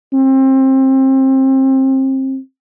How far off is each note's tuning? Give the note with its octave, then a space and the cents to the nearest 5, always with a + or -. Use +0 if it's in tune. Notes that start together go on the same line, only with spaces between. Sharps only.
C4 +25